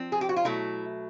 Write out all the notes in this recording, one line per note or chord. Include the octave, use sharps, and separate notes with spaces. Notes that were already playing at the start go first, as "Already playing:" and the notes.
Already playing: F3 C4
G#4
G4
F#4
F4
B2 F#3 A3 E4